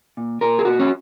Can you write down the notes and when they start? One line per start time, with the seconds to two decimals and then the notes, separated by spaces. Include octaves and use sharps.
0.17 A#2
0.41 A#2 A#4
0.59 G#4
0.65 A#2 F#4
0.79 C#4